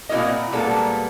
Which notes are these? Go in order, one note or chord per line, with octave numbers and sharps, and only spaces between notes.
A#2 C4 E4 F#4 A#4 D#5
A#2 G3 G#3 A#3 B3 A4